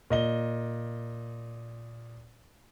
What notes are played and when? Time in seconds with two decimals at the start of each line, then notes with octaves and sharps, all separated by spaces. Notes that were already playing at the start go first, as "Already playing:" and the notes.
0.10 A#2 D#5 G7